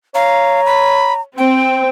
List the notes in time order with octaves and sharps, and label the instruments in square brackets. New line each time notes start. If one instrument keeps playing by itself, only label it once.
[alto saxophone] C#5 [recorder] F5 [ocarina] A#5
[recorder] B5
[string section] C4 [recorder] G5